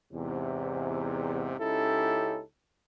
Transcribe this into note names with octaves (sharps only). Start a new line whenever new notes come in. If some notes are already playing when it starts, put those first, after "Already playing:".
E2 G#2 C3
C#2 C#4 D#4 E4 G4 A4